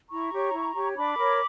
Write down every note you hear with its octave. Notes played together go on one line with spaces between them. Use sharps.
E4 A#5 C#6
G4 C#5
E4
G4 C#5
D4 B5 D6
A#4 C#5